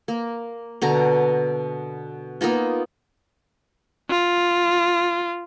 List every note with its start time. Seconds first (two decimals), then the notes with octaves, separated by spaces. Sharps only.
0.08 A#3
0.82 B2 D3 A#5
2.41 A#3 B3 D#4 F4
4.10 F4